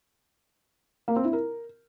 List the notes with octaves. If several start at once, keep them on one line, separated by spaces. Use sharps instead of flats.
A#3
C4
E4
A#4